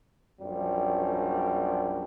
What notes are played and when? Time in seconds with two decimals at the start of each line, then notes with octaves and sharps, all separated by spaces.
0.39 A#1 F#2 G3